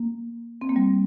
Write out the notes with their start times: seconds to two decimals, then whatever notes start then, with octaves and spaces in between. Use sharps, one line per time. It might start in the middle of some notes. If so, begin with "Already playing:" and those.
Already playing: A#3
0.61 C4
0.69 A#3
0.76 G3